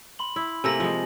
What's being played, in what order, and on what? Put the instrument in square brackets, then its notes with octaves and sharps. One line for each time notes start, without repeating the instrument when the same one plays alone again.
[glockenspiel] B5 C6 F#7
[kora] E4
[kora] C3 A3 A#3 [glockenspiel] G#5 A#6 F#7
[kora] F3 G#3